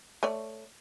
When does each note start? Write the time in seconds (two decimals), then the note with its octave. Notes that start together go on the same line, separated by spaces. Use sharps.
0.23 A3 C#5 D5